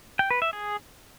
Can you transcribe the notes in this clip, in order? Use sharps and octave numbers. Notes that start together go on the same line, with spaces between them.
G5
B4
E5
G#4